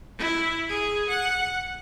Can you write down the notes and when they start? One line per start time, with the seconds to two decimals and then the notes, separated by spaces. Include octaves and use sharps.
0.18 E4
0.69 G#4
1.08 F#5